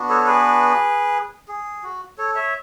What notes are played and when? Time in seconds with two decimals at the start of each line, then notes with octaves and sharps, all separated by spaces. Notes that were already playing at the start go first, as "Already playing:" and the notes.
Already playing: B3 D4 F#4
0.09 A4 C#5
0.20 C#5
0.27 G#4 B4
1.48 G#4
1.83 F#4
2.18 A4 C#5
2.35 C#5 E5